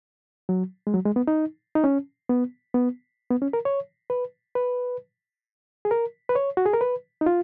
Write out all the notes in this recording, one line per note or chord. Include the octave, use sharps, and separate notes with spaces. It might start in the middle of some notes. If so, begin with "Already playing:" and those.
F#3
G#3
F#3
G#3
B3
D#4
D#4
C#4
B3
B3
B3
C#4
A#4
C#5
B4
B4
G#4
A#4
B4
C#5
F#4
G#4
A#4
B4
D#4
F4